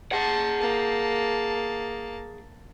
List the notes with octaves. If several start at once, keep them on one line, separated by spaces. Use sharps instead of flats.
G#4 F#5 A5
A#3 A5